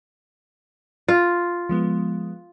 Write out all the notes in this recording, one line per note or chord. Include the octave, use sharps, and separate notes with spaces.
F4
F3 G#3 B3